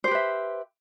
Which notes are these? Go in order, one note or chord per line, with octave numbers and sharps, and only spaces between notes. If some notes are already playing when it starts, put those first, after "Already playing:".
G4 B4 C5 E5